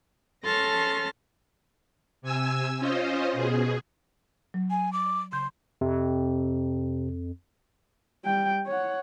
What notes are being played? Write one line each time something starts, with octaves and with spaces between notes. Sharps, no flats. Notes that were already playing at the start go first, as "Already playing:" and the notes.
C#4 A4 A5 C6 F6 A#6
C3 G#5 E6
C#4 F4 C5 D#5
B2 G#4
F#3
G#5
D6
C#3 C6 G6
F2 C3
G3 G5
C#5 F#5